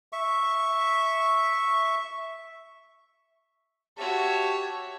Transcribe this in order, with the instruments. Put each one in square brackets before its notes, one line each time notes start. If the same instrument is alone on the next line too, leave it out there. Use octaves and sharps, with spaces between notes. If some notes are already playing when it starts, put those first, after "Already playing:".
[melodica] E5 C#6
[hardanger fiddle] F#4 E5 [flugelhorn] G4 [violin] C#5 [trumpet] A5